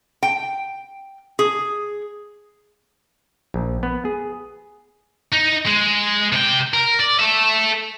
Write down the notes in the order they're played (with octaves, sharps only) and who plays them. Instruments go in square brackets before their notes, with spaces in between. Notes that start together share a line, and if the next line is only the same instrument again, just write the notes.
[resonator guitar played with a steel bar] G5
G#4
[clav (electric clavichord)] A#1
B3
G#4
[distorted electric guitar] D#4
G#3
C3 G5
A#4
D5
A4 E5